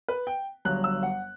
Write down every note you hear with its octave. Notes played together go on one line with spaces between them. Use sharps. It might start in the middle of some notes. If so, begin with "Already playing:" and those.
B4
G5
G1 G2 F#3 F#6
E6
F#5